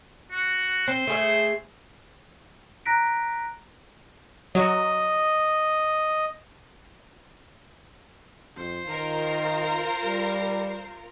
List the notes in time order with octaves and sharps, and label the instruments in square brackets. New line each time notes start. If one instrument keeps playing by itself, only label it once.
[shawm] F#4
[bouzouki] C4 [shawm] C5
[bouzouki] A3 G#4 E5
[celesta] A#5 F#6 A#6 B6 D7
[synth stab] F#3 F#4 [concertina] D#5
[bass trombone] F2 [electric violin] C5
[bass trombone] D#3 [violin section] F4 A#4
[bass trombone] G3